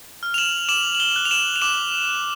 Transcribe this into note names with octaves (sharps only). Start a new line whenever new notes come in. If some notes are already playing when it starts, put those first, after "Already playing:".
F6
F7
E7 F#7
D6 E7 F#7
F#7
F7 G7
F#6
F7
E7 F#7
F7
D6 E7 F#7
F#6